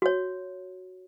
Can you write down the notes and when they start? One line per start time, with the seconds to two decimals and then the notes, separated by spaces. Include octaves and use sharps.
0.02 F#4 C#5